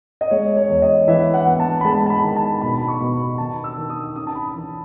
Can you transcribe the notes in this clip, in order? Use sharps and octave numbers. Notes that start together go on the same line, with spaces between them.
D#5
G#3 C#5
C#5
E2
D#5
E3 E5
F#5
B3
A5
B5
G#3 A5
A5
B5
D#3
A5
B2 B5
B5
C#6
B2
B5
D#3 A5
E6
D#3
D#6
C#4 D#6
A5
B5
E3